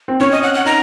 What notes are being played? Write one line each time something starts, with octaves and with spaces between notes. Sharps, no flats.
C4
C#4 C#5
D#5
F#5
F#5
D#4 A#5